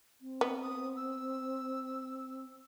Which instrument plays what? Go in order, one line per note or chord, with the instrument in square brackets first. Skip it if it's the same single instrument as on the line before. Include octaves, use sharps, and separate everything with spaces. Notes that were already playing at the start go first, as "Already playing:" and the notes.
[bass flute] C4
[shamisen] B3
[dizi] D#6
E6